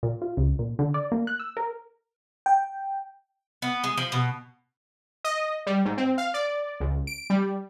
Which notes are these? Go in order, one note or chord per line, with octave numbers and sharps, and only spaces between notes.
A#2
F4
C#2
A#2
D3
D5
A#3
F#6
E6
A#4
G5
B3
G#3
F3
B2
D#5
G3
G#2
C4
F5
D5
C#2
D7
G3